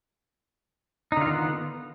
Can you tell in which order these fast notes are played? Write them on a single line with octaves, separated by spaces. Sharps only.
D#4 D3 F4 D#3 B3